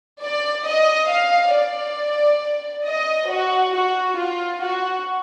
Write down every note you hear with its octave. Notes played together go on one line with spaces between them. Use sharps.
D5
D#5
F5
D5
D#5
F#4
F#4
F4
F#4